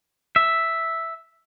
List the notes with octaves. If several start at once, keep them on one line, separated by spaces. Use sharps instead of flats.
E5